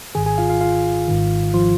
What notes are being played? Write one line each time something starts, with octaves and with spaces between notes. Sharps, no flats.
G#1 G#2 D#3 G#4 G#5
G#4 G#5
F4 F5
F4 F5
F4 F5
G#1 G#2 D#3
F3 F4